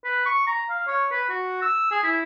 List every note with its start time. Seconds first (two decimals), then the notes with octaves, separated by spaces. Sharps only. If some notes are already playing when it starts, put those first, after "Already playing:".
0.04 B4
0.26 C#6
0.47 A#5
0.69 F5
0.88 C#5
1.11 B4
1.30 F#4
1.62 E6
1.91 G#4
2.03 E4